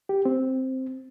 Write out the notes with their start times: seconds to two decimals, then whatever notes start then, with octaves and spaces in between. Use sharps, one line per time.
0.09 G4
0.25 C4